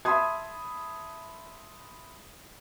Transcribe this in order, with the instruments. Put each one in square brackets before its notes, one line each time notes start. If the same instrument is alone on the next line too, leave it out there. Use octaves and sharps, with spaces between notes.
[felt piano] E5 A5 B5 C6 D#6 G#6